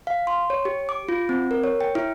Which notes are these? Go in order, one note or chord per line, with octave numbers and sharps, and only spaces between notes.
F5
C6
C#5
G4
D6
F4
C4
A#4
C#5
G5
E4